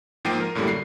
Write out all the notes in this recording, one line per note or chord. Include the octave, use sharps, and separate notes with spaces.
G#2 F3 A#3 G5 C7 D#7
A#4
F#2 A2 D3 G3 A#3
C7